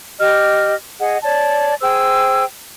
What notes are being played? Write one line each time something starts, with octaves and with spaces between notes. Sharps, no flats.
G4 D#5 F6
G#4 D#5 F#5
C#5 D5 A5
G#4 C5 G5 E6